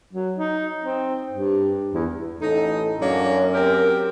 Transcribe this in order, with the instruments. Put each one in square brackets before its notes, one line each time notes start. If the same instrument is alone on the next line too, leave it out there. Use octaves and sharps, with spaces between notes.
[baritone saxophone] F#3
D#4
C4
G2
E2
[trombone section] A1 A4 [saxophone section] D#4
[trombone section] F#2 [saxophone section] A#3 D4 C#5
[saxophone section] C4 G4 A#4